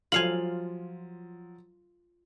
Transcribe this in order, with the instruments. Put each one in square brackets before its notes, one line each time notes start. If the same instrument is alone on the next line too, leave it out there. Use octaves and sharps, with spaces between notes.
[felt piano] F3 F#3 [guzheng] F4 F5 G#5 [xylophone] F#7